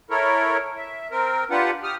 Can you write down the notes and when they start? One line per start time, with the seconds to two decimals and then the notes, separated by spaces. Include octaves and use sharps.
0.10 E4 A4 A#4 C#5
0.77 E5
1.11 C4 A#4
1.50 D4 F4 G4 B4 F#5
1.83 G4 D#6 F6